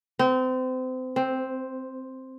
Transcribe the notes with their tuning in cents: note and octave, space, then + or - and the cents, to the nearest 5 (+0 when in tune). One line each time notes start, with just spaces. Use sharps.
C4 -30
C4 +0